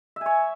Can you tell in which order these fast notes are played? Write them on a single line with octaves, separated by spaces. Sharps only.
E5 G#5 C#5